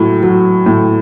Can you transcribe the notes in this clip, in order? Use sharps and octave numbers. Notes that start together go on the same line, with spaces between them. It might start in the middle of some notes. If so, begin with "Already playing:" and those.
Already playing: A2 F#3
F#3
A2